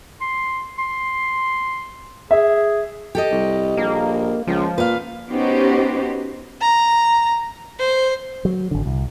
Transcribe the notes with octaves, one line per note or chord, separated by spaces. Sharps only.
C6
C6
G#4 E5
G4 A4 D#5
C2
A#1 A#3
C#2 F3
A#2 B4 F5
B3 C#4 D#4 F#4 G4 C5
A#5
C5
F#3
G#1 D3
C2